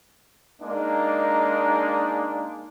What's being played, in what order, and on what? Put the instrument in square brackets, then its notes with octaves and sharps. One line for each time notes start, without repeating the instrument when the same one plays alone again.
[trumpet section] G#3 A#3 D4 D#4